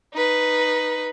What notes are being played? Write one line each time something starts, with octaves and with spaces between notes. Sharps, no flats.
D#4 B4